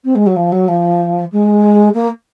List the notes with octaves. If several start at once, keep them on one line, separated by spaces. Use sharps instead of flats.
C4
G#3
F#3
F3
F#3
F3
G#3
A#3